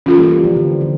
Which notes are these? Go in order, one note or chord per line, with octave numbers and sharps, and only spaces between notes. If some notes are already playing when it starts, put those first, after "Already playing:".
E3 C#4 F4 A4
G3 A#3
G3
F3
D3
D3